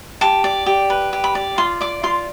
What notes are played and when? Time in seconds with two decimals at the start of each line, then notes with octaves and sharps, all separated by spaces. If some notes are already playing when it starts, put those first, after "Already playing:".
0.21 G4 A5
0.44 D5
0.66 G4
0.90 B4
1.13 G4
1.24 B5
1.35 D5
1.58 F4 C6
1.81 D5 D6
2.03 F4 C6